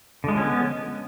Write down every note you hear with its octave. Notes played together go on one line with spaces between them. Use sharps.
D3 F3 G#3 B3 C#4